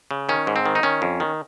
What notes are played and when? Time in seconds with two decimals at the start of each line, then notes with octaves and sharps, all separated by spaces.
0.11 C#3
0.29 D#3 C#4
0.47 G#2
0.56 C4
0.66 D#3
0.75 D#4
0.83 D#3 C#4
1.02 F2
1.20 D#3